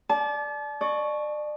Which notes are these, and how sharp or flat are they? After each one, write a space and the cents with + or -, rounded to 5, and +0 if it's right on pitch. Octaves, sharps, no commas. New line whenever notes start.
D5 +0 A5 -35
D5 +35 C#6 +0